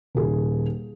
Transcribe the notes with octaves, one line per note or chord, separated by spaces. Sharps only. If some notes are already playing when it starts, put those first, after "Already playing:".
D#1 G#4